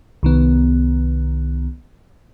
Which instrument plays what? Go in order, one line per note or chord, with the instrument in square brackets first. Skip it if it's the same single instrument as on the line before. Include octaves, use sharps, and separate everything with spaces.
[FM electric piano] C2 D#3 B3